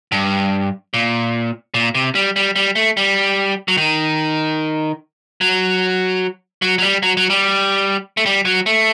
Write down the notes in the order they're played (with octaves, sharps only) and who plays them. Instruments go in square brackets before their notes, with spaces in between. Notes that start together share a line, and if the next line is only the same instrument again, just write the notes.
[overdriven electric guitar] G2
A#2
A#2
C3
G3
G3
G3
A3
G3
F#3
D#3
F#3
F#3
F#3
G3
F#3
F#3
G3
A3
G3
F#3
A3